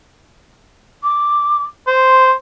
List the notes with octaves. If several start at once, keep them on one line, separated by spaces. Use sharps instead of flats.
D6
C5 C6